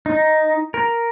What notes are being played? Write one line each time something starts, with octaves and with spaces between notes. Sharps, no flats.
D#4
A#4